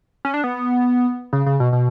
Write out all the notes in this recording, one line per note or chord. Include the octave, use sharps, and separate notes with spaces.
C#4
D4
B3
C#3
C#3
B2
B2